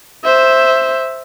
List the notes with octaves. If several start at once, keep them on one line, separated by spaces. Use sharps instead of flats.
C5 E5